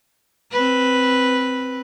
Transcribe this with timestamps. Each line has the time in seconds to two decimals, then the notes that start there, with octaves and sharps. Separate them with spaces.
0.51 C4 B4